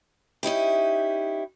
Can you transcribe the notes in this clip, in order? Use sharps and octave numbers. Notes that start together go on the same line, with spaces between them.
C#4 D#4 E4 G4